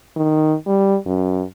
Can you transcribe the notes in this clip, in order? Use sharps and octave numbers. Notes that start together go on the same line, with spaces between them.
D#3
G3
F#2